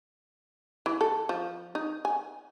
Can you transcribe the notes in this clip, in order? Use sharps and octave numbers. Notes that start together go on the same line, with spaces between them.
E3
A4
F3
D#4
G#5